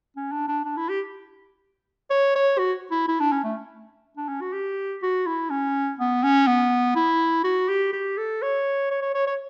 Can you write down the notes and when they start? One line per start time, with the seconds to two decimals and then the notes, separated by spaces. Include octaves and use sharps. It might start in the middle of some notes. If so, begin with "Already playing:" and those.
0.16 C#4
0.32 D4
0.48 D4
0.65 D4
0.77 E4
0.89 G4
2.10 C#5
2.35 C#5
2.58 F#4
2.91 E4
3.08 E4
3.20 D4
3.32 C#4
3.44 A3
4.17 D4
4.28 C#4
4.41 F#4
4.53 G4
5.02 F#4
5.27 E4
5.50 C#4
5.99 B3
6.23 C#4
6.47 B3
6.96 E4
7.44 F#4
7.68 G4
7.93 G4
8.17 A4
8.42 C#5
8.91 C#5
9.02 C#5
9.14 C#5
9.27 C#5